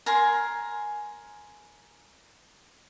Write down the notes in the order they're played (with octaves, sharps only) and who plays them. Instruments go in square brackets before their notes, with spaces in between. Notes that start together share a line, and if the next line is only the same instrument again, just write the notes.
[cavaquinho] A#4 G#5 C6